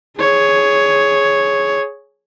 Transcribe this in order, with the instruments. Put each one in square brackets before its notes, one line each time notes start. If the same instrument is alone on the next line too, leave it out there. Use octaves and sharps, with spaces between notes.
[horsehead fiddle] G#4 C#5